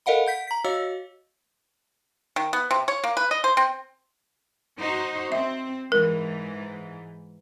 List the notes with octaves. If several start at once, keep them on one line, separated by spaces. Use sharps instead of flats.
A4 A#4 D#5 F5 F#5 B5
F#5 G6 B6
A#5 B6
F#4 C#5 D#5 F5 E6
D#3
B3
C3
C#5
A#3
B4
D#5
C5
C4
D#4 F#4 C5
C4 E5
G#2 E3 A#4